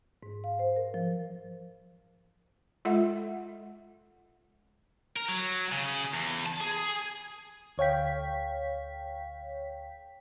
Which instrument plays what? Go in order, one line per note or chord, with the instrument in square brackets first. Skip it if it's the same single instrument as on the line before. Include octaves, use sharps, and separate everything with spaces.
[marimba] G#2
F5
C5
A#4
F3
[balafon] G#3 F4 A4 E5 F#5
[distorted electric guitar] A#4
F#3
C#3
E2
A5
G#4
[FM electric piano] D2 C#5 F5 G5 B6